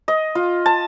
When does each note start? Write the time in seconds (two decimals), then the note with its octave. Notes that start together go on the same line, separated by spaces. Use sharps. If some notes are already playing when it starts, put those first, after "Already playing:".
0.08 D#5
0.35 F4
0.66 A5